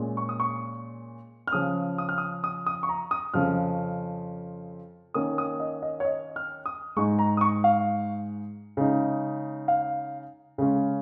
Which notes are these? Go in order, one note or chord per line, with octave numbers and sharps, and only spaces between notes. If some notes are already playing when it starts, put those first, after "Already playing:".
Already playing: A#2 G#3 C#4
C#6
D#6
C#6
F6
C#3 F3 C#4 D#6
D#6
F6
D#6
D#6
D#6
C#6
A#5
D#6
F2 C#3 F3 F6
D#3 A#3 C#4 D#6
D#6
D#5
D#5
C#5
D#5
F6
D#6
G#2 G#3 D#4 C#6
A#5
D#6
C#6
F5
C#3 G#3 D#4
F5
C#3 G#3 C#4